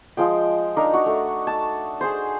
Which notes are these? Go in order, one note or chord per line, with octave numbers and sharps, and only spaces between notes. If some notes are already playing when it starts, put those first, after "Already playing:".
F3 G#3 G5
D4 D#4 A#4
F#4
A3
A5
G#4 C5